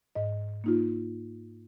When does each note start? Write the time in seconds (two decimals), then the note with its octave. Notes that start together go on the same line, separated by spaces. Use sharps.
0.15 G#2 D#5
0.64 A#3 D#4 F4